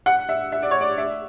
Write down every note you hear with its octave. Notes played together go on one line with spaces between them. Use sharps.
F#5
E5
E5
D5
C#5
D5
E5